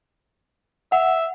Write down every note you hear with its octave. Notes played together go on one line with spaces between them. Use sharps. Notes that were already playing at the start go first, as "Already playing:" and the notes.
E5 F#5